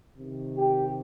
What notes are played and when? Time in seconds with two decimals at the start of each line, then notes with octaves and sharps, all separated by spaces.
0.17 C3 D#3
0.57 G4